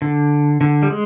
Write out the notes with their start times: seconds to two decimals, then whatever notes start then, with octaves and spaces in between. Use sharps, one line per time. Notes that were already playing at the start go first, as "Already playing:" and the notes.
0.02 D3
0.61 D3
0.83 G3
0.90 G#3